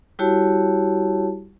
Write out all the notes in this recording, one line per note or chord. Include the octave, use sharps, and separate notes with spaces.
G3 E4 F#4 G4 C#5 A5